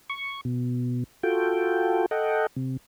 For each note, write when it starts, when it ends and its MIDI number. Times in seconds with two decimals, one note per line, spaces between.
0.10 0.41 85
0.45 1.04 47
1.23 2.06 65
1.23 2.06 66
1.23 2.06 69
1.23 2.06 79
2.11 2.47 69
2.11 2.47 75
2.11 2.47 78
2.11 2.47 79
2.56 2.77 48